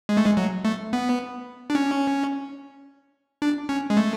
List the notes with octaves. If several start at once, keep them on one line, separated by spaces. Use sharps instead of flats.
G#3
A3
G#3
F#3
A3
B3
D4
C#4
D4
C#4
G#3
A3